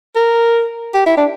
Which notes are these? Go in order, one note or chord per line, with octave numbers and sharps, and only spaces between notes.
A#4
G4
E4
D4